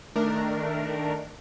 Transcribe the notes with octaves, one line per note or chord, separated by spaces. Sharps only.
D#3 A3 D4 A#4